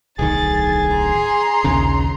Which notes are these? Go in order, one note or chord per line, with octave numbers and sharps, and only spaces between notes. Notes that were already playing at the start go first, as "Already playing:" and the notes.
D1 B1 D#3 G#4 A6
A#5 C6
A#1 D#2 C#3